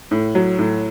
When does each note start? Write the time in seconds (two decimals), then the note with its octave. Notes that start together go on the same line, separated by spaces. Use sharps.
0.11 A2
0.35 F#3
0.59 A2